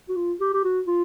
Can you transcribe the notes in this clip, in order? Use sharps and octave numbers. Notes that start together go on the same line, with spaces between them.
F#4
F4
G4
G4
F#4
F4